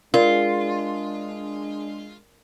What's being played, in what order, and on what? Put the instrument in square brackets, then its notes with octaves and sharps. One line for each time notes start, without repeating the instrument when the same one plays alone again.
[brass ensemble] G#3 D4 [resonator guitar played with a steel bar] F4 [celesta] A#4 D5